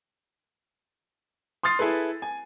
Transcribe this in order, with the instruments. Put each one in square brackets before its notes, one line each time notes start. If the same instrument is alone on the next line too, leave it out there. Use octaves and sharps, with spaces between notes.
[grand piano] C6 D#6 F6 A6 C7
E4 G#4 A4 B4
G#5